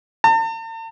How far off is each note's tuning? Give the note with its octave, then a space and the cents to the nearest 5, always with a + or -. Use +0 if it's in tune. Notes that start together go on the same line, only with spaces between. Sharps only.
A5 +45